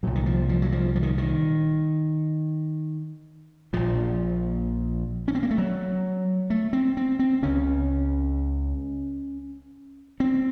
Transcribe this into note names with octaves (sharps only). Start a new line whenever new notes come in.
C2 A#2 F#3
D#3
F3
F3
F#3
F3
F3
D#3
D#3
A#1 A#2 F3
C#4
C4
A#3
A3
F#3
A3
C4
C4
C4
C#2 C#3 C#4
C4